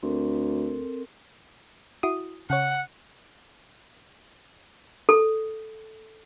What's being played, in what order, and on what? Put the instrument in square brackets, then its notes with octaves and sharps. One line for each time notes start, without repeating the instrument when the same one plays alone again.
[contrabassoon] D2 [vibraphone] C4 A4 A#4
[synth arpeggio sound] E4 F#4 D#6
[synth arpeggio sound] C#3 C#5 [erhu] F#5
[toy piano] A4